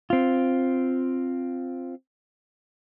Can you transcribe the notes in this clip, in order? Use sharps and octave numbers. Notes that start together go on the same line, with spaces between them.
C4 F4